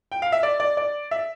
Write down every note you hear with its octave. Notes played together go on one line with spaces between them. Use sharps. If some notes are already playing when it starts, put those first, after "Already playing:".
G5
F5
E5
D5
D5
D5
E5